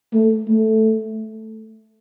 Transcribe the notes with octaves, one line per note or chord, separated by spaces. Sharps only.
A3
A3